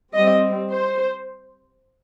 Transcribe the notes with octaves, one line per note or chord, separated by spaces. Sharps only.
G3 C4 D#5
C5